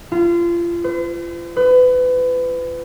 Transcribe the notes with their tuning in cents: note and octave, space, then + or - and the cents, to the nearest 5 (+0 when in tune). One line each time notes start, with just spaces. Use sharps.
F4 -30
C5 -45
B4 +30